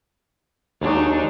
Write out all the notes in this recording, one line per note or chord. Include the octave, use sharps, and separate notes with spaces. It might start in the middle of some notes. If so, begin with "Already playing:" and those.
D#2 F#3 G#3 D4 D#4